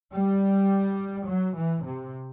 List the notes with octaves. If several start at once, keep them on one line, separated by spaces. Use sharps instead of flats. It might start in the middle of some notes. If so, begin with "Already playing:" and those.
G3
F#3
E3
C3